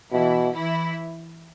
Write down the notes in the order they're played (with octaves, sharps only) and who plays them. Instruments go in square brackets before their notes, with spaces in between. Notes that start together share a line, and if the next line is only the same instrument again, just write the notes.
[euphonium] B2 [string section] E3 E4
[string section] E3 E4